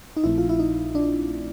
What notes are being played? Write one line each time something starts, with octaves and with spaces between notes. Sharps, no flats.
D#4
A#1 A#2 F3 A3 C4 E4
F4
E4
D#4
D4